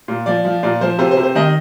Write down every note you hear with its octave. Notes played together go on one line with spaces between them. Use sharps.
A#2
F3 D5
F3
A#2 D5
F3 C5
C3 C5
C5
C3
C5
D#3 D#5